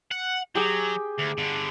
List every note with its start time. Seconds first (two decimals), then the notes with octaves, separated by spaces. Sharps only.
0.11 F#5
0.55 F#3 G4 G#4 G5
1.18 D2
1.38 G2 D3